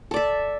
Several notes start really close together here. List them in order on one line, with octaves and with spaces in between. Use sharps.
A4 D5 E5